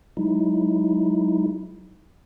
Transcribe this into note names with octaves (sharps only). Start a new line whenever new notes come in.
F#3 G#3 D#4 E4